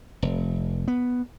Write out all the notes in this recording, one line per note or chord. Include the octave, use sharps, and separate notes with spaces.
F1
B3